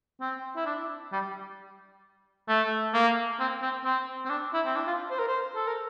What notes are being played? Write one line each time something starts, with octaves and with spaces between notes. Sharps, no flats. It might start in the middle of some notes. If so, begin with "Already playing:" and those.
C4
E4
D4
G3
A3
A#3
C4
C4
C4
C4
D4
E4
C4
D4
F4
C5
A#4
C5
A4
A#4